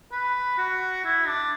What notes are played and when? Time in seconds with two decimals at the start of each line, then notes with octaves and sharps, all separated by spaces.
0.12 B4
0.58 F#4
1.05 E4
1.27 D4